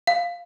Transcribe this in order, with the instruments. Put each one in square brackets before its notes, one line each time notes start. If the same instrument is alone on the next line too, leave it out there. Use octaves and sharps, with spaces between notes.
[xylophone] F5